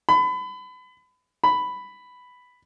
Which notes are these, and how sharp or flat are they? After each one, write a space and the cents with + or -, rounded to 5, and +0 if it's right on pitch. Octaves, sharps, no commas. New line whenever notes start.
B5 +30
B5 +5